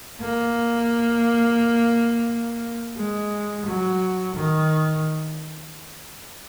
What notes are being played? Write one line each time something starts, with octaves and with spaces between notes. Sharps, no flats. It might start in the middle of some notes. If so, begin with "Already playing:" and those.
A#3
G#3
F#3
D#3